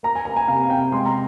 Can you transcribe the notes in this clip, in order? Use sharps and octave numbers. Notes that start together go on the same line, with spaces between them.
A#3 A#5
G#5
A#3 A#5
G#5
C3 F5
C3 G5
G#3 C6
A#5